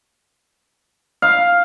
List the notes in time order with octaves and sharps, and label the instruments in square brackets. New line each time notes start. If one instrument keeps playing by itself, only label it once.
[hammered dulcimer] F5